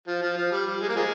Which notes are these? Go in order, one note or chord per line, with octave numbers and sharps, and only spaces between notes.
F3
F3
F3
G3
G3
G#3
A#3
F3 G#3